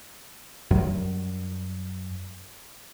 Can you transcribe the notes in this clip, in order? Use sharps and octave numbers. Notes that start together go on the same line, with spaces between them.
F#2 F#3 G3